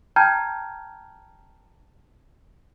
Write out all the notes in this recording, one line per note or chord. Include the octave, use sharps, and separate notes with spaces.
G5 A5 A#5 F6 G6 G#6